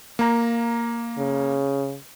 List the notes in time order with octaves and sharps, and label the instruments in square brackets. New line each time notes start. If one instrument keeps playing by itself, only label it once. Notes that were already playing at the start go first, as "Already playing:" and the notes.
[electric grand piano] A#3 A#5
[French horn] C#3